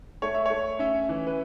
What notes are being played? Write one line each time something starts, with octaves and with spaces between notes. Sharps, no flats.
A3 C#5
E5
A3 C#5
C#4 E5
E3
B4